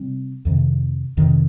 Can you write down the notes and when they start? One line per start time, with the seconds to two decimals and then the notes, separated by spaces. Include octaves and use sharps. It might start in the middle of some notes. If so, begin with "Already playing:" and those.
Already playing: C3 G3 C4
0.45 F2 C3 D#3
1.17 F2 C3 D#3